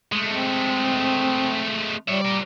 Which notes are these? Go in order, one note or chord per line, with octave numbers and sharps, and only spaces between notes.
G#3 A3
C4
G3 C#5 E5
A#4 D5